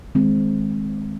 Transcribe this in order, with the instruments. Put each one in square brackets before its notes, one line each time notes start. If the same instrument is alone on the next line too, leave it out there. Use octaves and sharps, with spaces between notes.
[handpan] D#3 G#3 C4